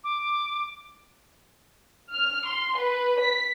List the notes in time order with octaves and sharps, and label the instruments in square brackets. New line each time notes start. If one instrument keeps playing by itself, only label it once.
[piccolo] D6
[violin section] F6
C6
B4
B6